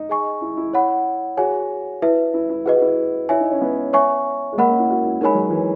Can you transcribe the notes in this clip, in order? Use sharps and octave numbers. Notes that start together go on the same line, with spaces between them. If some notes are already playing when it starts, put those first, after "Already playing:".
Already playing: D#4
G#4 D#5 G#5 C#6
E4
E4
C#5 F#5 B5
F#4 G#4 C#5 G#5
E4 B4 E5
E4
E4
F#4 G#4 B4 D#5
F#4
E4
E4 C#5 E5 G#5
D#4
C#4
B3
C#5 E5 G#5 C#6
G#3
A#3 A#4 D#5 F#5 B5
C#4
E4
F#4
E4
G#3 D#4 A#4 C#5 G#5 B5
F#3
E3